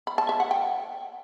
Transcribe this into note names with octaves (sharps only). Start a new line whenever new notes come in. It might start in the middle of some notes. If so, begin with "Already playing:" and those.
B5
A5
E5
F#5
G5